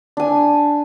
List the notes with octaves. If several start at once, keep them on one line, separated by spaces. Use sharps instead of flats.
D4 G#5